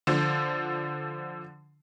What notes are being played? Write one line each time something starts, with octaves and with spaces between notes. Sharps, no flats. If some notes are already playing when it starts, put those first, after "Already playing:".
D3 F3